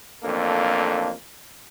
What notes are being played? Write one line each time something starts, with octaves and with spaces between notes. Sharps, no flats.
A1 F2 A#3 D4 A4